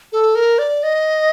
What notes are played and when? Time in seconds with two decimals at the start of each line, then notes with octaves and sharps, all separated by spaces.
0.12 A4
0.35 A#4
0.59 D5
0.83 D#5